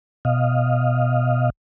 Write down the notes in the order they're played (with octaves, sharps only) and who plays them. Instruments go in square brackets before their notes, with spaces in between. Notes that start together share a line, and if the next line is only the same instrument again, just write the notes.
[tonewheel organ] B2 D#5 F5